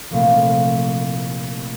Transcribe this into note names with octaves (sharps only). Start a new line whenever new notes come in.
C2 A#2 F3 A3